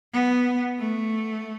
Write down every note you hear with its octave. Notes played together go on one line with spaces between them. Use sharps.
B3
A3